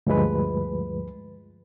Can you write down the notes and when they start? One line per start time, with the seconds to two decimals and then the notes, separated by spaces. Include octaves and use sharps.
0.07 D2 G2 F3 G#3 B4